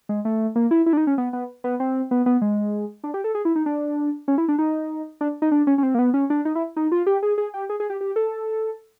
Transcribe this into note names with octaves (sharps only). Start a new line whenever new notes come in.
G#3
A3
A#3
E4
E4
D4
D#4
C#4
B3
B3
B3
C4
B3
B3
G#3
D4
G4
A4
G#4
E4
D#4
D4
C#4
E4
D4
D#4
D4
D#4
D4
C#4
C#4
C4
A#3
B3
C#4
D4
D#4
E4
D#4
F4
G4
G#4
G#4
G4
G#4
G#4
G4
G4
A4